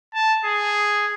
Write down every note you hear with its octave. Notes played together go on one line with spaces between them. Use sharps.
A5
G#4